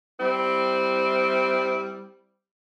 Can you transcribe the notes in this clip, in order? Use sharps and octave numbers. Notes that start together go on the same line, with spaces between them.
G3 C4 E4